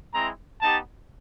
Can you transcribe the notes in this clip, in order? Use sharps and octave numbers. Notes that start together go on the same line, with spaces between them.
G#3 C4 E4 A#5
B3 D#4 G4 A5